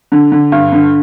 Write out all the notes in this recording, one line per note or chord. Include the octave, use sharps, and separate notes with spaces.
D3
D3
G2
D3